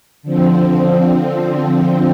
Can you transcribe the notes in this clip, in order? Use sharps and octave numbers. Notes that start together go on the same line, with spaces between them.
D3 F3 C4